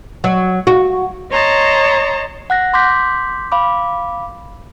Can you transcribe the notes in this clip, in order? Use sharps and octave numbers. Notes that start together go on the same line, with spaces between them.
F#3
F#4
C#5 D#5 A5 A#5 C6
F#5 F#6 A#6
C6 D6 G6 B6
F5 B5 D6